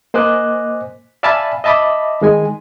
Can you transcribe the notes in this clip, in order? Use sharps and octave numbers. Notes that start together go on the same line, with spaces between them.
A#3 C5 D#5 G#5 D6 F#6
D5 E5 F5 G#5 A5 B5
D#5 E5 A5 B5 D6
D#3 G#3 G#5